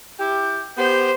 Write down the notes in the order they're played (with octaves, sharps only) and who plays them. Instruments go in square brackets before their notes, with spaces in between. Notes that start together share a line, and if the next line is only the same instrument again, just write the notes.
[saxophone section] E4 G4 [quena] G6
[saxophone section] B3 [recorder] G4 [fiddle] C5 [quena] G6